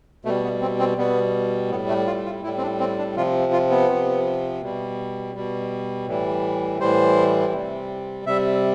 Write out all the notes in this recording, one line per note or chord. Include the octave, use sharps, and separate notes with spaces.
B2 G3 A3
B3
C4
C4
B2 G3 B3
A2 B3
G3
A3
F4
F4
A2 G3 E4
C4
D4
C4
D4
C3 F3 F4
F4
B3
C3 F3
B2 G3
B2 G3
A2 E3 G3
A2 E3 G3 C5
C3 G3
C3 G3 E5